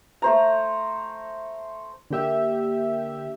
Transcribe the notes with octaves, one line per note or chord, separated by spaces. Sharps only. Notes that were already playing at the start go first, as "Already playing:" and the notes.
A3 C5 A#5
D3 A#3 G4 E5